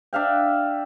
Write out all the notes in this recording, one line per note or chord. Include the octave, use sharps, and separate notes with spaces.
D4 E5 F5 G5